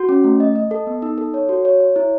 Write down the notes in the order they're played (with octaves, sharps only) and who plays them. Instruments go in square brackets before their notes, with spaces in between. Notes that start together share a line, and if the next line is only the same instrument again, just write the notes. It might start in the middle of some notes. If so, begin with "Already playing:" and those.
Already playing: [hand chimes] F#4
C#4
A3
D#5
D#5
A4
B3
D#4
A4
C#5
F#4
C#5
C#5
E4